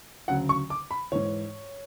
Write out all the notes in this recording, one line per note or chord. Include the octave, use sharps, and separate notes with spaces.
D2 C#3 F#3 F#5
C#6
D6
B5
G#2 E3 C#5